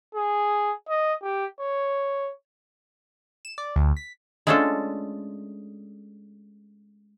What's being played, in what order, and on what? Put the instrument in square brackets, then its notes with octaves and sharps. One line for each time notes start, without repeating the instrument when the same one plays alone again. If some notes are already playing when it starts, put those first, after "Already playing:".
[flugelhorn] G#4
D#5
G4
C#5
[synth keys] E7
D5
D2
B6
[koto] G#3 A3 C#4 D4 F4 A4